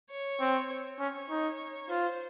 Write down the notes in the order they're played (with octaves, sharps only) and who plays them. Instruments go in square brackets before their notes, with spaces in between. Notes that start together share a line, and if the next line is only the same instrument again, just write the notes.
[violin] C#5
[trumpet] C4
[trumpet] C#4 [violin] C#5
[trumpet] D#4
[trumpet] F4 [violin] C5